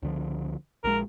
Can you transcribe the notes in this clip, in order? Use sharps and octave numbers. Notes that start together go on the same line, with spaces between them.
C#2 D3 F3
A#1 G#3 A#4